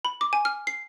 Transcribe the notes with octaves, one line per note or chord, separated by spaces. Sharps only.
B5
D6
G#5
F6
C7